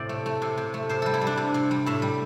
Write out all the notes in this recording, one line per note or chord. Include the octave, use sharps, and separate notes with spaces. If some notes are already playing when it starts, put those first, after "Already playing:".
Already playing: A2 C3 D5
A3
A3
C3
C3
A3
C3 C5
G3 A4
E4
G3
D4
C3
C3
G3
A2 E5
G3